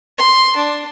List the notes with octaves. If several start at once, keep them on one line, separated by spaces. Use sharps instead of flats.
C6
D4